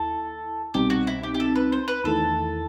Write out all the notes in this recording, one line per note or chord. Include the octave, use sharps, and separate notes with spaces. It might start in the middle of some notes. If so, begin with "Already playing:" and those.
Already playing: D#2 E4 A4
C2 B2 G3 C4 D#4 G4
F#4
E4
G4
G4
A4
B4
C5
B4
E2 D#3 A3 E4 A4